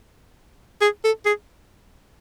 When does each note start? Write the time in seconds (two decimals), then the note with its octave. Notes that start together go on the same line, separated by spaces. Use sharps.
0.81 G#4
1.04 A4
1.26 G#4